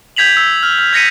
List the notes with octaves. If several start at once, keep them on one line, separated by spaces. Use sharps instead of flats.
G6 G#6 B6 F7 F#7
E6
F6
F6
G6 G#6 A#6 B6 C#7 D#7